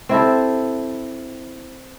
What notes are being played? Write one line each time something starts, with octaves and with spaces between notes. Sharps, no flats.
C4 E4 G4 A4